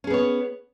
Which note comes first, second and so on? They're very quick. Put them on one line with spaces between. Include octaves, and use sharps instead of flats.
C#4 G#4 B3 C#5